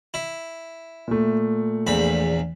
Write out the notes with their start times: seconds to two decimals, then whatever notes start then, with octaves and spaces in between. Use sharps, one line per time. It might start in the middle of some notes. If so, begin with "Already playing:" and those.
0.14 E4
1.08 A#2 A3
1.87 A#1 E2 B5